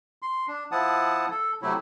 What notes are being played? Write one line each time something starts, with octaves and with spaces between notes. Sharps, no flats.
C6
D4
F3 E4 F#5 A5 D#6
A4
C3 F#3 A3 E4